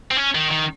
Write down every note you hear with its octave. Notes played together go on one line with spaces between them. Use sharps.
C4
C#4
D#3
D#3